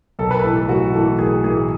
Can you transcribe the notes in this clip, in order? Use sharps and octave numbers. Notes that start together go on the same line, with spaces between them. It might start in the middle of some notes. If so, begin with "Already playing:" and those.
B1 A4
B4
A2 E3 A4
A4
B1 F#4
A2 E3 A4
B1 G#4
A2 E3 G#4